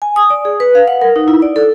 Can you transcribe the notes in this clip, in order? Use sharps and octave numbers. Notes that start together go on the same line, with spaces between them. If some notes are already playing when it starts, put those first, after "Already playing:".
G#5
D#6
D5
G#4
B4
F5
F#5
A#4
D#4
E4
D5
A4